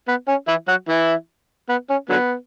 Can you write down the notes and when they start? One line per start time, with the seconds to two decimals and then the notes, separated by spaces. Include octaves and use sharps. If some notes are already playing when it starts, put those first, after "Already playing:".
0.08 B3
0.28 C#4
0.48 E3 E4
0.68 F#3 F#4
0.89 E3 E4
1.69 B3
1.90 C#4
2.10 D3 F#3 B3